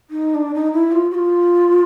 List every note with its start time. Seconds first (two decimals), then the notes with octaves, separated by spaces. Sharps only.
0.10 D#4
0.35 D4
0.54 D#4
0.73 E4
0.92 F4
1.11 F#4
1.15 F4